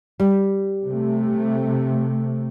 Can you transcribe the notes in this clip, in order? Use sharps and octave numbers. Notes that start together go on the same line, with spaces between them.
G3
C3 A3